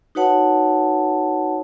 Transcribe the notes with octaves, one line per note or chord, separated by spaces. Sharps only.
D#4 F#4 B4 C#5 F#5 A5